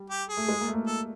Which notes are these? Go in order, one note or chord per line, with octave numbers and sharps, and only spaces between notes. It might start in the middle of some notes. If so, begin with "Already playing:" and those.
Already playing: G3
G4
G#4
A3
G#3
A#3
A3
A#3
A4